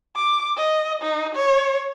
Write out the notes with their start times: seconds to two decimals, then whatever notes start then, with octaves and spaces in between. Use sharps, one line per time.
0.16 D6
0.57 D#5
1.02 D#4
1.35 C#5